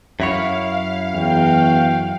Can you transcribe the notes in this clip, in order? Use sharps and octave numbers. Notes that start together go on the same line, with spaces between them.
F#2 E4 C#5 F5
E2 F#4 G5